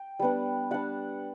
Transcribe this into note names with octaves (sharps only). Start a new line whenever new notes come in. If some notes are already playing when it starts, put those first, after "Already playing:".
Already playing: G5
G3 B3 D4
G3 D4 F#5